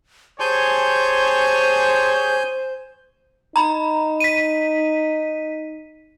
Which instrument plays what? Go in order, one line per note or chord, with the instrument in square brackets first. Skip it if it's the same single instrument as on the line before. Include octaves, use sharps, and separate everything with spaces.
[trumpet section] G4 G#4 C#5 [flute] C5 [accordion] G#5 G6 [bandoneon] A5 C6
[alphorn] D#4 [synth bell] A#5 B5
[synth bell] B6 D#7